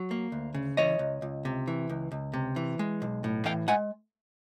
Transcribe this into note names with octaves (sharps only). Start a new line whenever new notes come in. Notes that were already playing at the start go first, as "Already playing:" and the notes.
Already playing: F#3
A#3
D2
C#3
E3 C#5 D#5
C#2
C#2
C3
E3
C#2
C#2
C3
E3
G#3
B1
A2
E3 F5 G5
G#3 F#5 G#5